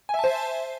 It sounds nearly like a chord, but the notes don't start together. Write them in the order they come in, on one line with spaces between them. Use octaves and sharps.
G#5 E5 A5 C5